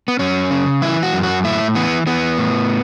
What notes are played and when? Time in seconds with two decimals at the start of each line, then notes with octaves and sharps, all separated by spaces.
0.08 B3
0.19 F#2 C#4
0.51 C#3
0.82 E3 E4
1.03 F#4
1.13 F#2
1.23 F#4
1.44 A2 E4
1.75 E3 B3
2.06 E3 B3
2.38 A2